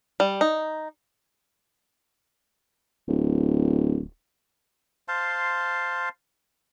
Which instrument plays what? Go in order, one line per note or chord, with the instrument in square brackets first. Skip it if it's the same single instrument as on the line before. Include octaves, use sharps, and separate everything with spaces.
[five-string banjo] G3
D#4
[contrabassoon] D1
[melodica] C5 F5 A5 C6